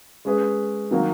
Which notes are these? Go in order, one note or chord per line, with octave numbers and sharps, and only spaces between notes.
G#3 C#4 G#4 B4
D#3 F#3 A#3 D#4 F#4